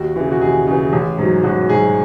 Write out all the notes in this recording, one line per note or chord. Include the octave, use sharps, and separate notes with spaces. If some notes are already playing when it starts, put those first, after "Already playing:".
Already playing: D#2 F#4
C#3 E3
F#4
D#2 G#4
C#3 E3
A1
G#2 F#3
A1 F#4
G#2 F#3 G#4